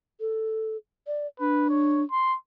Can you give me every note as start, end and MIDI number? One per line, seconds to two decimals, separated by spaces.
0.20 0.77 69
1.07 1.27 74
1.40 2.03 62
1.40 1.69 71
1.70 2.02 73
2.11 2.35 84